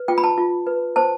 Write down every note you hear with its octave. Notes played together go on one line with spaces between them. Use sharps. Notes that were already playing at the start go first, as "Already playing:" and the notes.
Already playing: B4
F4 G5
B5
A5
F4
B4
C5 A5